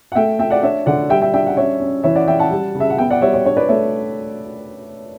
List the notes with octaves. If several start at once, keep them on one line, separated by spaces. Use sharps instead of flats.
F#5
A3 E5 G5
A3 E5 G5
D5 F#5
D4 C#5 E5
D3 D5 F#5
G3 E5 G5
E5 G5
D4 E5 G5
F#5
C#4 C#5 E5
C#4
E3 C#5 E5
D5 F#5
E3 E5 G5
F#5 A5
G3
C#3
E5
F#5
B3 E5 G5
D5 F#5
G3 C#5 E5
C#5
D4 C#5
B4 D5
A3 C#5 E5